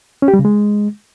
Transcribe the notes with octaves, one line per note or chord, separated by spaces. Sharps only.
C#4
G4
G3
C#3
G#3